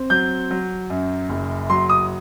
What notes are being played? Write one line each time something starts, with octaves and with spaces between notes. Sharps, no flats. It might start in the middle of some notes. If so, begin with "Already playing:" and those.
Already playing: C4
F#3 G6
F#3
F#2
F#1
F#3 C6
D#6